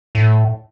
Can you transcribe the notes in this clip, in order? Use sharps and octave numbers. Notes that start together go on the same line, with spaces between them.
A2